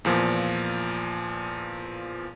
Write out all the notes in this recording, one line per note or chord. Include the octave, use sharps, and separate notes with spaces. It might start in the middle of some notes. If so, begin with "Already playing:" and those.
E2 A#2 F3